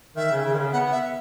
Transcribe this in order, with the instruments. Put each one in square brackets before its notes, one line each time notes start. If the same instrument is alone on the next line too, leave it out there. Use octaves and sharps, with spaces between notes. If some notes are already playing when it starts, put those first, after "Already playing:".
[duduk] D#3 [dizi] E5
[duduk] C#3
C#3
D#3
C#3
[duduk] B3 [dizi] F#5
[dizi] E5